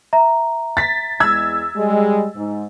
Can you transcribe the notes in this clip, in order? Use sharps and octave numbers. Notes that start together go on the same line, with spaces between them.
E5 A#5
A6 B6
E2 G#3 E6 G#6
G3 G#3
G#2